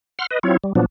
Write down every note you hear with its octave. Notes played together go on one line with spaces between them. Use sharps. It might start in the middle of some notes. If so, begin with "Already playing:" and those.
F#5 C6 F6
B4 D#5
F#3 C4 E4 F4 C#5
G3
A#2 F3 F#3 B3 D4